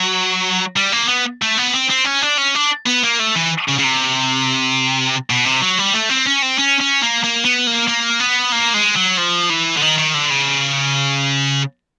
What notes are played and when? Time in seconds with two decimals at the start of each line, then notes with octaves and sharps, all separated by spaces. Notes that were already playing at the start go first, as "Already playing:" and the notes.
Already playing: F#3
0.76 G3
0.92 A#3
1.08 B3
1.42 A3
1.58 B3
1.74 C4
1.90 C4
2.05 C#4
2.22 D4
2.38 C#4
2.55 D4
2.87 B3
3.04 A#3
3.20 A3
3.35 E3
3.68 C#3
3.78 C#3
3.84 C3
5.30 B2
5.45 C3
5.62 F#3
5.78 G3
5.94 A3
6.10 C4
6.26 C#4
6.42 C4
6.58 C#4
6.81 C#4
7.02 A#3
7.24 A#3
7.45 B3
7.67 A#3
7.88 A#3
8.20 B3
8.52 A#3
8.74 G#3
8.96 F#3
9.18 F3
9.50 E3
9.77 D3
9.81 D#3
9.98 D#3
10.14 D3
10.30 C#3